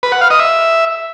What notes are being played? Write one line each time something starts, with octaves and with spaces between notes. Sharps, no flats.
B4
F#5
F5
D#5
E5